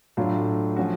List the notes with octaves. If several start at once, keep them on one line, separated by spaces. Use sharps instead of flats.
A2 F#3 A3 D4 F4
F3 A3 C#4 F#4